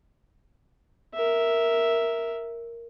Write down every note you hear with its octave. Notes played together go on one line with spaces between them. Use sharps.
A#4 E5